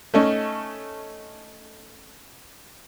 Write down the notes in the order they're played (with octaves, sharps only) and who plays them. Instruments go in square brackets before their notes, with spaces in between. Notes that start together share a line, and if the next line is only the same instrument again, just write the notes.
[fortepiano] A3 C#4 D#4